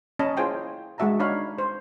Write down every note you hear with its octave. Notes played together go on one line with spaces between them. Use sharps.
C#4 D#5 A5 B5
E4 F4 G#4 C5 G5 G#5
G#3 D4 F#4 E5 A5 A#5
D4 D#4 C#5 F5 B5
C5